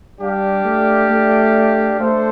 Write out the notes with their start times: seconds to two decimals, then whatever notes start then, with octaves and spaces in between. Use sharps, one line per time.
0.20 G3 D4 G4 D5 F5
0.65 A3
1.10 A3
2.00 A3 D4 A4 C5